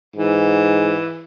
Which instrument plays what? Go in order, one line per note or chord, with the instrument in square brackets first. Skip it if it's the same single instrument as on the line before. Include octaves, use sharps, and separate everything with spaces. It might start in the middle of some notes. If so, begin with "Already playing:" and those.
[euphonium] G#2 [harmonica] E3